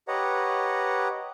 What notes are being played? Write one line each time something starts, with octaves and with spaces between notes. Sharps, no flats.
G4 B4 C#5 D#5 F#5 A#5